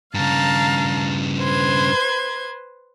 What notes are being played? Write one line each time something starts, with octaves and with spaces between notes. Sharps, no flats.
G2 C#3 F5 A5 A#5
B4 C5 G#6